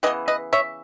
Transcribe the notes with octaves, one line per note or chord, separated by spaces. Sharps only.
C#3 E3 B3 B4 D#5
B4 D#5
C#5 E5